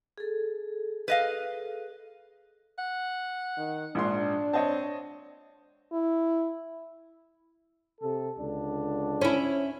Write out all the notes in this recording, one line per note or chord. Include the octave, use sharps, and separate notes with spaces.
G#4 A4
B4 D#5 F5
F#5
D#3
A#1 G#2 D4 C6
C4 C#5 D#5 A5
E4
C3 A4
C#2 D3 D4
C#4 E4